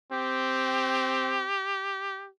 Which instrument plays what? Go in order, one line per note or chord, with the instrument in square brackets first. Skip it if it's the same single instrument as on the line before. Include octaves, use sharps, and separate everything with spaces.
[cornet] C4 [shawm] G4